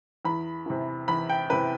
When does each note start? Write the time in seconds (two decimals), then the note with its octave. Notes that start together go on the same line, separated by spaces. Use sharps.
0.25 E2 B5
0.66 C3 E3
1.08 E2 B5
1.29 G5
1.50 C3 E3 B4